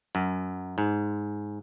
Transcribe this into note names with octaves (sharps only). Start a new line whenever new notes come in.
F#2
G#2